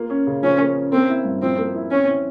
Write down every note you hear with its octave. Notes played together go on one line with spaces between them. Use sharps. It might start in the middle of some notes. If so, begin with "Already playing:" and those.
Already playing: A#3 F4
C#4
C#3
F3 C#4
A#3
C#4
A#3 C4
E4
G2
F3 C4
A#3
E4
C4 C#4
E3